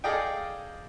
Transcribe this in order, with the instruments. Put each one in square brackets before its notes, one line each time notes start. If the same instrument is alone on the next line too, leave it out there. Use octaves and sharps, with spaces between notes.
[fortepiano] G#4 A4 D5 D#5 F5 G5